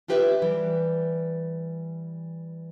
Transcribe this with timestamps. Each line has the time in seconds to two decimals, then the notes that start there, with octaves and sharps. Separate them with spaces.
0.08 D4 F4 G4 B4 D#5 E5
0.42 E3 G3